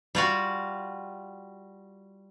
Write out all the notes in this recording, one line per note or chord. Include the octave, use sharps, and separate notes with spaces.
G3 F4 F#4